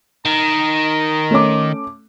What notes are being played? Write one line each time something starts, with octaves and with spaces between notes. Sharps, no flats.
D#3 A#5
A3 C#4 D6